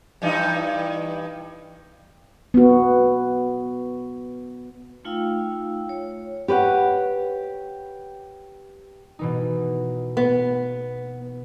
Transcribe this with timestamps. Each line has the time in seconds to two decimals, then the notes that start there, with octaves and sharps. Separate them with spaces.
0.22 G2 E3 D#4
2.54 B3 F#4
5.05 A3 D#4 F4 F5 G5 E6
5.89 C#5
6.48 G4 B4 C#5 F#5
9.19 B2 E3 D#4
10.17 B3